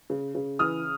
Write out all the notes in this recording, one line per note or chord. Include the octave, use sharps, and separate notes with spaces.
C#3
C#3
E3 D#6 F6